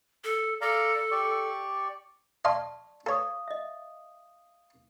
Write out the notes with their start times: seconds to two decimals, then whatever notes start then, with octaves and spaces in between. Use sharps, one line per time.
0.24 A4
0.61 A4 D5 F5 A#5
1.11 G4 D5 C#6
2.45 D5 D#5 F5 A5 C6 C#6
3.06 A4 C#5 F5 D#6
3.48 D#5 E5